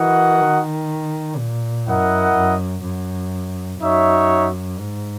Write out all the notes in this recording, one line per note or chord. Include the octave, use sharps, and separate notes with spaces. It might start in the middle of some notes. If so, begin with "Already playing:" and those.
Already playing: E3 F#4 A#4 D#5 F#5
D#3
A#2
F#2 E4 A#4 D#5 F#5
F#2
F#2
F#2 D#4 F#4 C#5 E5
G#2